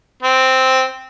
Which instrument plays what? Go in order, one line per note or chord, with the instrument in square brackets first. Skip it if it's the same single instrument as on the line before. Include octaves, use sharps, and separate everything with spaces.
[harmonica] C4